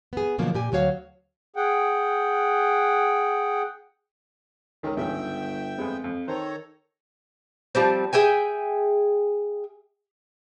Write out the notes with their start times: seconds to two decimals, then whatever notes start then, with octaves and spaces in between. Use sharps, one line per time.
0.13 B3 G#4
0.38 B2 D3 F3 F#3 A#3
0.54 A#2 G4 G#5
0.72 D2 F#3 F#4 C#5 F5
1.56 G#4 F#5 G5
4.83 C#2 D#3 A#4
4.97 G1 C#2 G#2 D#3 E5 G5
5.78 F2 G#3 B3
6.04 F2
6.28 D#3 A4 C5 C#5 A#5
7.75 F3 G3 C4
8.13 G#4 E5 G5 G#5